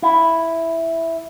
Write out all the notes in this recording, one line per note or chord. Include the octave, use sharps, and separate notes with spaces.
E4